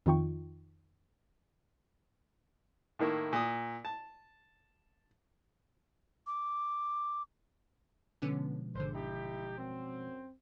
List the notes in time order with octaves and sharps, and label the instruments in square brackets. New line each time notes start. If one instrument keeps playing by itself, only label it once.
[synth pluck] F2 D#3 D#4 F4 G5 C#6
[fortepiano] A2 D#3 A#3 E4
A#2 D#6
A5
[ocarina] D6
[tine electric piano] B2 F3 G#3 [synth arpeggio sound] D3 B3 C#4
[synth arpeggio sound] G#1 D3 [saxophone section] C5
[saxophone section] D#4 E4 G4
F#2 C4